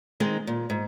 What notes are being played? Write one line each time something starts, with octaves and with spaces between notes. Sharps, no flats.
D#3 G#3 C4 D#4
A#2
G#2